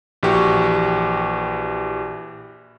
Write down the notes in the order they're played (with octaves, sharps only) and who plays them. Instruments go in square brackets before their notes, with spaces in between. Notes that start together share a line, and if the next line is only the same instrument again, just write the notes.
[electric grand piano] A#1 E3 F#4 G4 C#6